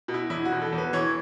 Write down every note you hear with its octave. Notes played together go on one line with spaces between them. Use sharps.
B2
E4
E2 E4
F#4
B2
A4
E2
B4
E3 C#5